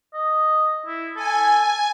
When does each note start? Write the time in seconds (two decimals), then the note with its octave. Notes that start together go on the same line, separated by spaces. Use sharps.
0.14 D#5
0.86 E4
1.16 A4 G#5
1.58 G#5